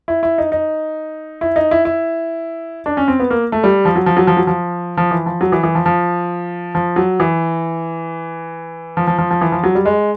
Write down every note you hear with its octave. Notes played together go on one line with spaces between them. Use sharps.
E4
E4
D#4
D#4
E4
D#4
E4
E4
D4
C#4
C4
B3
A#3
A3
G3
F3
F#3
F3
F#3
F3
F#3
F3
F3
E3
F3
F#3
E3
E3
F3
F3
F3
F#3
E3
F3
F3
F3
F3
E3
F3
F#3
G3
G#3